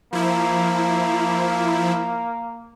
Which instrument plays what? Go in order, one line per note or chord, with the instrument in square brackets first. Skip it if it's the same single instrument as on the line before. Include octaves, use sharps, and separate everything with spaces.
[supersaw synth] F3 E4 [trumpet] A#3